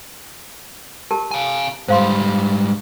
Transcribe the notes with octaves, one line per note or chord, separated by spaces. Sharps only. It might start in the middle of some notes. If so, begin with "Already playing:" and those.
G4 A#4 A5
F5 G#5
G#2 G3 C5 F5 C6